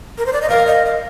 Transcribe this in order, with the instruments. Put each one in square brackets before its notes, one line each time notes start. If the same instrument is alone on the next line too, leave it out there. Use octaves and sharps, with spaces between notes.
[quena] A#4
C5
D5
D#5
[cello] A#4 [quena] F5
[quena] D#5
F5